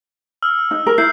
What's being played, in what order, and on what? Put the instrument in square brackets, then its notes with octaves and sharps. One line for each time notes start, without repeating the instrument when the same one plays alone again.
[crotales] E6 F6
[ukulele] D#4
A#4
[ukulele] E4 [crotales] E6 G6 C7